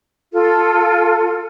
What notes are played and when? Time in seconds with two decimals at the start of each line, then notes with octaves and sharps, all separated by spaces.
0.33 F4 A4